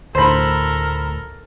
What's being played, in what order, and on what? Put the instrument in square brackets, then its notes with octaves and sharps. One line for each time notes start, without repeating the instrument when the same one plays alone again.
[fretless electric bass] D2 A2 [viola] A4 A#4 [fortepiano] C5 B5